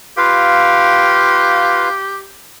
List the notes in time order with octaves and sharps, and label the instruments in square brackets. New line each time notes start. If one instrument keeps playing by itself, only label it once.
[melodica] F4 B4 F5 [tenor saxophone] G4